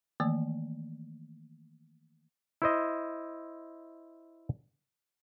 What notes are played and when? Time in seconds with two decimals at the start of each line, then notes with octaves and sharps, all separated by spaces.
0.20 D#3 E3 A3 A#3
2.62 E4 C5 D#5